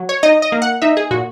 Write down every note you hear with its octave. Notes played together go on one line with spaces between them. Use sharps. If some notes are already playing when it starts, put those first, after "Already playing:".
Already playing: F#3
C#5
D#4 D#5
D#5
A#3
F#5
D#4 E5
G#4
A#2 F#4